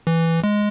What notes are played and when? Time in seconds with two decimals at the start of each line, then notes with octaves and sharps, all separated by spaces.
0.07 E3
0.44 G#3